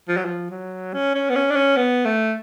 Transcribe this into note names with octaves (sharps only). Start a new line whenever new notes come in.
F3
F#3
F3
F#3
C#4
C#4
B3
C#4
D4
C#4
B3
A3